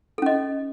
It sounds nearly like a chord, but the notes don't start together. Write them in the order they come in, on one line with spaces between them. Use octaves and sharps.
A4 C#4 D#5